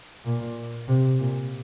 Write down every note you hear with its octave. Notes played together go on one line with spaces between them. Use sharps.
A#2
C3
A#2